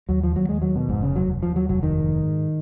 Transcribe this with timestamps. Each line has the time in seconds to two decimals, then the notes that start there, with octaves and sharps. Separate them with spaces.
0.09 D#2 F#3
0.24 F3
0.36 D#2 F#3
0.49 G#3
0.62 D#3 F#3
0.76 B2
0.89 F1 G#2
1.02 C#3
1.16 D#2 F#3
1.43 D#2 F3
1.56 F#3
1.69 F1 F#3
1.83 D#3
1.96 G#2
2.23 G#2